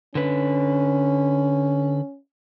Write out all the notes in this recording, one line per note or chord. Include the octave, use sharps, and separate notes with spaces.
D3 C#4 B4